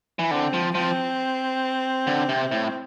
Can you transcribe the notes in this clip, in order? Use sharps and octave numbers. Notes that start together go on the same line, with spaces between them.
E3
D3 C4
F3
F3 C4
D3
C3
A2